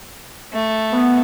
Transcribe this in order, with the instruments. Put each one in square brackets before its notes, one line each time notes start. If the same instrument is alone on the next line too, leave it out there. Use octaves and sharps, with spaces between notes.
[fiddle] A3
[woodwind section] B3